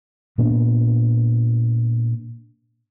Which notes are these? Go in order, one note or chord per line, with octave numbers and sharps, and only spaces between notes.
A#2 A#3 B3 D4